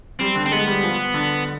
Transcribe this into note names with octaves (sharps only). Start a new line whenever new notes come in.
G3 C4
D3
C4
G#3 B3
G3
F3
D3